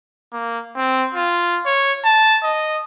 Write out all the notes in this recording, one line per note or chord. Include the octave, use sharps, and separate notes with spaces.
A#3
C4
F4
C#5
A5
D#5